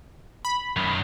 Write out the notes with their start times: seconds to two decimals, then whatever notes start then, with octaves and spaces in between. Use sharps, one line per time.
0.45 B5
0.76 F#2 D#3